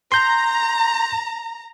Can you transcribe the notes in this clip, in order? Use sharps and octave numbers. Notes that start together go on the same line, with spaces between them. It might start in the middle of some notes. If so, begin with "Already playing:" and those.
A#5 C6 G6